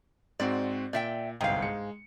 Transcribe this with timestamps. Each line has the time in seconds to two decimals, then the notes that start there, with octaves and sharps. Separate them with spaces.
0.40 G#2 C4 F#4 D5
0.93 A#2 D5 E5 G5
1.41 G1 C2 G#2 F5 G5
1.62 G#3 C#7